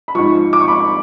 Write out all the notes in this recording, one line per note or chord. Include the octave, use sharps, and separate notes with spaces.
B5
G#2 F3 C#6
D6
C#6
B5
C#6